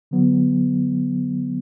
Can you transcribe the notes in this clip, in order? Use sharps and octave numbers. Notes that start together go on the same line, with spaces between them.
D3 F#3 B3